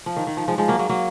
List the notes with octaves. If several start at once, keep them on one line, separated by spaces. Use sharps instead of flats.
F3
D#3
D#3
F3
F3 G#3
F3 G#3
F#3 A#3
F#3 A#3
F#3 A#3